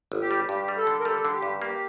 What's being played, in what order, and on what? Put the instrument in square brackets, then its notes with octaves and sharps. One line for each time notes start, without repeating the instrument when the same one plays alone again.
[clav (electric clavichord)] G1
[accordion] G4
[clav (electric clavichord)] G3
[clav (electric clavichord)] G2 [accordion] G4
[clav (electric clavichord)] G3
[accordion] A4
[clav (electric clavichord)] D3
[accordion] A#4
[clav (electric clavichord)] G3 [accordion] A4
[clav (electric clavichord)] D3
[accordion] G4
[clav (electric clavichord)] G2
[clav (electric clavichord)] A#3 [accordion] G4